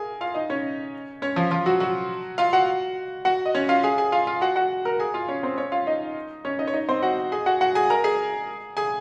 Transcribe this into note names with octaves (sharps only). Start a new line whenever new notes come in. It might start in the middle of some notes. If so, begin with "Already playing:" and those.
Already playing: G#4 A#4 G#5
F4 F5
D#4 D#5
C#4 C#5
C#4 C#5
F3 F4
F3 F4
F#3 F#4
F#3 F#4
F4 F5
F#4 F#5
F#4 F#5
D#5
C#4 C#5
F4 F5
G#4 G#5
G#4 G#5
F4 F5
F4 F5
F#4 F#5
F#4 F#5
A#4 A#5
G#4 G#5
F4 F5
C#4 C#5
C4 C5
C#4 C#5
F4 F5
D#4 D#5
C#4 C#5
D#4 D#5
C#5
D#4 D#5
C4 C5
F#4 F#5
G#4 G#5
F#4 F#5
F#4 F#5
G#4 G#5
A#4 A#5
G#4 G#5
G#4 G#5